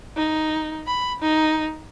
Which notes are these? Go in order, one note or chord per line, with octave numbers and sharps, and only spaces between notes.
D#4
B5
D#4